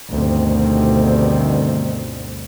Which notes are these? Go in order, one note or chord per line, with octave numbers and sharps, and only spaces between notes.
D2 G2 B2 D#3 G3 C4